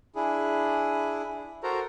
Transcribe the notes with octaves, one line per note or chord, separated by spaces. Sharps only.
D4 E4 G#4
F#4 A4 A#4 C5 A#5